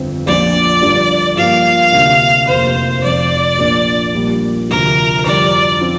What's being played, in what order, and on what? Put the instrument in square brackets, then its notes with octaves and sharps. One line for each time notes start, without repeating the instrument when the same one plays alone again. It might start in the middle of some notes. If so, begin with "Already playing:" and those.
Already playing: [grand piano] G1 F2 F3 C4
[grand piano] A#1 A#2 F3 D4 [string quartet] D5
[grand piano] G1 G2 D3 F3
[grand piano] G2 F3 A#3 [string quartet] F5
[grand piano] D2 C3 A#3 D4
[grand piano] F1 F2 C3 A#3 [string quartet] C5
[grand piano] F1 F2 F3 C4 [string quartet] D5
[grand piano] A#1 A#2 A#3 D4
A#1 A#2 G3 A#3
[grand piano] D2 C3 F3 [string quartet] A#4
[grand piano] F2 D3 G3 D4 [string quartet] D5
[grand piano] F3 C4